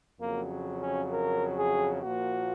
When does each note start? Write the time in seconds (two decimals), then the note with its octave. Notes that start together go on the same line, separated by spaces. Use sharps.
0.20 F2 C#3 F#3 A#3
0.81 C#4
1.12 A#4
1.58 G#4
2.02 A#2 F3 A#3 F#4